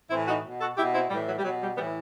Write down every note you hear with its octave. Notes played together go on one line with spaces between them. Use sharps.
A2 E3 C4 E4
D#4 F#4
B2
F#4 A4
B2 E4 G4
C4 E4
A2 E3 G3
F#3
G3
B2 F#3
G3
A2 E3 G3 B3